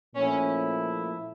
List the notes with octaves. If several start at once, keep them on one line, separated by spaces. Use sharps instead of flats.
A#2 F3 A3 C#4 E4